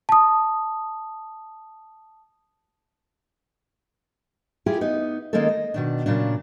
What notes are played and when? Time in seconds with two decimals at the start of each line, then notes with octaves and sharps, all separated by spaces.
0.09 A5 D#6
4.66 E4 F4 G4 G#4
4.81 B3 D#4
5.33 D#3 G#3 A#3 C#4 D#4 A4
5.48 D#5
5.74 B2 D#3 D4
6.06 A#2 C#3 F#3 D4